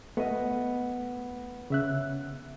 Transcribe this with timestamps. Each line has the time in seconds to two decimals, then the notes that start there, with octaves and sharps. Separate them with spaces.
0.17 A3 B3 D#5
1.70 C#3 E5 F#6